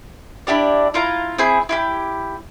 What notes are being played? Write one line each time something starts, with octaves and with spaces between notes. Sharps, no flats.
D4 E4 G4 D5
E4 F4 F5 A#5
C4 E4 G#4
E4 F4 G4